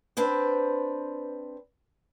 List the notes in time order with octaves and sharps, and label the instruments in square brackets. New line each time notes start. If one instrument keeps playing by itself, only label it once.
[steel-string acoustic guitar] C4 D4 B4 C5